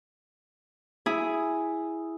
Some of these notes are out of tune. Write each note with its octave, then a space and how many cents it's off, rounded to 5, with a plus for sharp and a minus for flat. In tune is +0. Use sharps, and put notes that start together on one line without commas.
E4 +0 G#4 +0